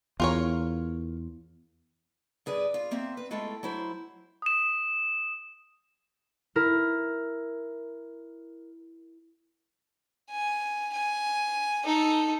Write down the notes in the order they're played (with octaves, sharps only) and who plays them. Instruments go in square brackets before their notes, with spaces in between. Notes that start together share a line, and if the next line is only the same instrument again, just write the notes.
[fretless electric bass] E2 [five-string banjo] F4 A#4 C#5
[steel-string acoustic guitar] G2 G#4 B4 D5
F4
F#2 A#3 C4 E5
B4
G#3 A3 E4 F4 A4 G5
F#3 E4 C5
[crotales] D#6 E7
[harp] E4 A#4
[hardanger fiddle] G#5
G#5
D#4 A4